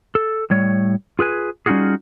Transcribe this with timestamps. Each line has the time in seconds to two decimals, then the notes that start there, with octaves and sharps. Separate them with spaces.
0.15 A4
0.50 A2 G3 C#5
1.19 F4 G#4 B4 G#5
1.66 G3 C#4 D#4 F4 F#4 G#4